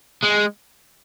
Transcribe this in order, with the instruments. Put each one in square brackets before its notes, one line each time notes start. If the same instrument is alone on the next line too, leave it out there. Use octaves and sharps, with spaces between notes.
[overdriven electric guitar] G#3